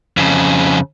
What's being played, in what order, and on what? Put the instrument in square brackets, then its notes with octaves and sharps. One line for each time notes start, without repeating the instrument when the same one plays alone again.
[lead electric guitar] F2 C#3